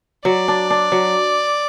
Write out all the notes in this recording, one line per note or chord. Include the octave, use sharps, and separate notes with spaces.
F#3 D5
D4
D4
F#3